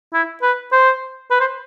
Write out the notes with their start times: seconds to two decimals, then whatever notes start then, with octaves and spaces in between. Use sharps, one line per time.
0.13 E4
0.42 B4
0.72 C5
1.31 B4
1.40 C5